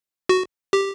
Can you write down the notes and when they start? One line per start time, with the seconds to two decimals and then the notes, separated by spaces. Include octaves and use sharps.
0.29 F#4
0.73 G4